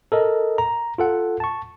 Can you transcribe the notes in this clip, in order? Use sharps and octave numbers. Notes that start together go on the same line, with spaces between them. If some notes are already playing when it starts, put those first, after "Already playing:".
A4 A#4 D#5
A#5
F4 A4 F#5
A5 C#6